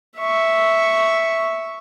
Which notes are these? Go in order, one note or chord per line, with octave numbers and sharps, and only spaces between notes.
E5 C#6